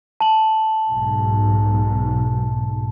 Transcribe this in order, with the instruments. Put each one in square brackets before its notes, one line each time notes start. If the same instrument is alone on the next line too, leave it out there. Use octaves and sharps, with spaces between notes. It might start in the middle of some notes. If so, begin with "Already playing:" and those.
[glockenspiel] A5 F#7
[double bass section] B1 G#2